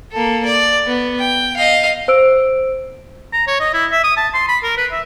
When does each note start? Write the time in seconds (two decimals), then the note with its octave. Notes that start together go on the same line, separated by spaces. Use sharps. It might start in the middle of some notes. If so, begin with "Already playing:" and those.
0.12 A#3 A4
0.45 D5
0.86 B3
1.19 G5
1.57 D#5 F5
2.08 C5 E6 D7
3.33 A#5
3.47 C#5
3.60 D#5
3.73 E4
3.92 E5
4.04 D#6
4.17 A5
4.34 C6
4.48 B5
4.63 A#4
4.77 B4
4.92 E5